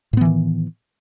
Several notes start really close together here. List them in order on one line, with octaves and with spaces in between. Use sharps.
A2 B3 E3 D#3